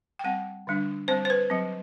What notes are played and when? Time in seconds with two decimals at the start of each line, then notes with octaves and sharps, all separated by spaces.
0.19 G5
0.24 G3 C4 F#5
0.67 D3 G3 D4
1.08 G3 C4 C5
1.25 C5
1.30 B4
1.50 F#3 C4